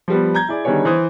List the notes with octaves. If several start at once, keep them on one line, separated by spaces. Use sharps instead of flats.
F3 G3 B3
A#5 G6 G#6
E4 G#4 D5
D3 D#3 G3 B3 G#4 C#5
E3 C5 D#6